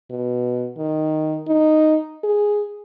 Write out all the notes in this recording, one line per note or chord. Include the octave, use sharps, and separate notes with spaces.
B2
D#3
D#4
G#4